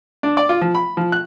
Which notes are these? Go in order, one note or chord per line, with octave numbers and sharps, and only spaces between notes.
D4
D5
F4
F3
B5
F3
F#6